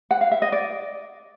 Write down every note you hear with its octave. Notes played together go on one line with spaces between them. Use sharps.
F#5
F5
E5
D#5
D5